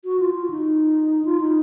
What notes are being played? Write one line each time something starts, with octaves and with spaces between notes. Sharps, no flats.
F#4
F4
F4
D#4
F4
D#4